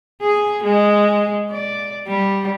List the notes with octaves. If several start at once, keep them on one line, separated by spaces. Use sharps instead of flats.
G#4
G#3
D5
G3